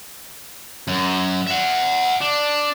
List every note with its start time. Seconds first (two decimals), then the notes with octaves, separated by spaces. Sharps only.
0.88 F#2
1.47 E5 F#5
2.21 D4